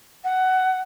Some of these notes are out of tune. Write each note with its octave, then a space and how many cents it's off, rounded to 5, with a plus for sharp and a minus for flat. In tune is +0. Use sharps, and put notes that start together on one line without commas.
F#5 +15